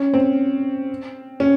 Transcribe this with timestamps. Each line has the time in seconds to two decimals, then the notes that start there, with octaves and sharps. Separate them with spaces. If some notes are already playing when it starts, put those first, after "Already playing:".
Already playing: C#4
0.14 C4
1.40 C#4